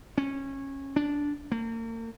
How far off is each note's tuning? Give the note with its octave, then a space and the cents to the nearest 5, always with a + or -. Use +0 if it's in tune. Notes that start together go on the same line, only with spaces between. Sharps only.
C#4 -20
D4 -10
A#3 -40